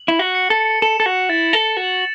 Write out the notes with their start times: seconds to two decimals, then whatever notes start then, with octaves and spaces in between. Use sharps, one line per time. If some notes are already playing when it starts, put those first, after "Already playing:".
Already playing: F#7
0.08 E4
0.19 F#4
0.35 C#7
0.50 A4
0.82 A4 E7
1.00 A4
1.06 F#4
1.29 E4 A6
1.53 A4
1.77 F#4 F#7